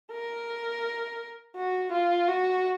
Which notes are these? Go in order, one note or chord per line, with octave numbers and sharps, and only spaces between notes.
A#4
F#4
F4
F#4